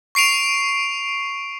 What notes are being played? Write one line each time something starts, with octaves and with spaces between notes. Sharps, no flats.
C#6 C7 D7 F7